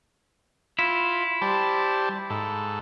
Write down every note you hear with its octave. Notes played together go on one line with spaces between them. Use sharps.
E4 F4
G3 C5 A5
G#2 A4